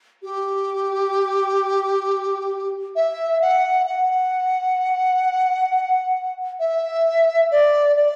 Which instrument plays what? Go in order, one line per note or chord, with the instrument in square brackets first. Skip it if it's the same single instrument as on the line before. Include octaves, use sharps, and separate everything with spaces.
[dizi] G4
E5
F#5
F#5
E5
D5
D5